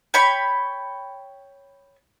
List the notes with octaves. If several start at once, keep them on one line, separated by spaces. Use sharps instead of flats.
C#5 G5 B5 C#6